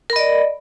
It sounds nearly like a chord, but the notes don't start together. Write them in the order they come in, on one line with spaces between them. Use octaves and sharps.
A#4 B5 D#5 D5